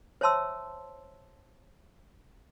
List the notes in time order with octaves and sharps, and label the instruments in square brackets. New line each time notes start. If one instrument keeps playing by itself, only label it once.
[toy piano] C5 C#5 E5 A5 C6 E6